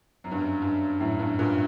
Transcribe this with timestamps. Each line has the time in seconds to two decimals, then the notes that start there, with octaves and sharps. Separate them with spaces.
0.24 F#2
0.31 G2
0.39 F#2
0.62 G2
1.00 F#2 A2
1.19 G2
1.39 G2 A#2